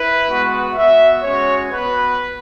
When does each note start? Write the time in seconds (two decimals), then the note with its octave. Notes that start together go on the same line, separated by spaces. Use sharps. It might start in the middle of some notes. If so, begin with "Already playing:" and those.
Already playing: E4 B4
0.27 G#3 B3 F#4
0.75 B3 F#4 E5
1.23 G#3 C#4 F#4 C#5
1.71 B3 F#4 B4